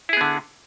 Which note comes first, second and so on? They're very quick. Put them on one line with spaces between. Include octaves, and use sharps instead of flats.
E4 G#4 B3 D3